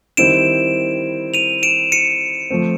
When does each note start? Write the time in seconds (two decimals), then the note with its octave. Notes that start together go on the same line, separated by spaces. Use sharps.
0.17 D#3 G3 C4 E4 D7 E7
1.34 D#7 F7
1.63 D7 E7
1.92 C#7 D#7
2.50 F3 A3 C4